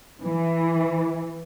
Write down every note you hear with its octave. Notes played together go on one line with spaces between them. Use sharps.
E3